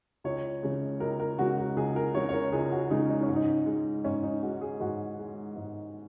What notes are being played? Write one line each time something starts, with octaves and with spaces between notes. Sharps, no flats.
C#2 C#5
C#3 G#3
C#2 A#4
A#4
C#3 G#3 F#4
F#4
C#2 G#4
A#4
C#3 G#3 C#5
C#5
A#4
C#2 G#4
F#4
C#3 G#3 D#4
D#4
C#4
G#2
D#4
G#3
G#2 C#4
D#4
G#3 F#4
G#4
G#2 F#4
G#3
G#2